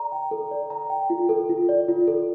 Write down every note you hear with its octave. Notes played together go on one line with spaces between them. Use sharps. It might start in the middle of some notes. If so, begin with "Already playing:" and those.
Already playing: A4 D5 A#5
G5
A4
D5
A#5
G5
F4
A4
F4
D5
F4
A4